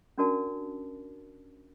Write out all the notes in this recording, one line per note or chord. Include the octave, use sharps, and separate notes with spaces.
C#4 D4 F#4 A#4 D5 A5